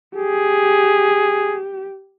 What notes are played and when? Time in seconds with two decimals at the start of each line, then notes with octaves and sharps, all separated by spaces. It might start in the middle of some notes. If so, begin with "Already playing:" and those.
0.16 G4 G#4